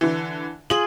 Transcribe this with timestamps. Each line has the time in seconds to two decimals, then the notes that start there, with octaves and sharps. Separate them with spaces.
0.01 D3 E3
0.70 F4 G#4 F#7